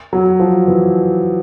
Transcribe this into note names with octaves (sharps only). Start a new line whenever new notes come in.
F#3
F3
E3